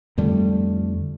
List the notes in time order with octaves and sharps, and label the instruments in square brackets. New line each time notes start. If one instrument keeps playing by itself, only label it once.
[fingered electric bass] F2 D3 G3 A3